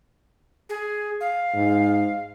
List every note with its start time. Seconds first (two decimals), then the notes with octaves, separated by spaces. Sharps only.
0.69 G#4
1.21 F5
1.54 G#2